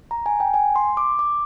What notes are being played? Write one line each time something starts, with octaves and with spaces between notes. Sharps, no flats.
A#5
G#5
G5
G#5
C6
D6
D6